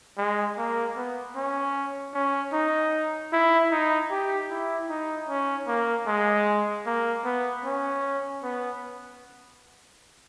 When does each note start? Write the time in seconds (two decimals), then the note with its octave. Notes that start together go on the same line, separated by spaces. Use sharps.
0.17 G#3
0.57 A#3
0.97 B3
1.35 C#4
2.14 C#4
2.53 D#4
3.32 E4
3.71 D#4
4.11 G4
4.50 E4
4.89 D#4
5.29 C#4
5.68 A#3
6.07 G#3
6.86 A#3
7.25 B3
7.64 C#4
8.43 B3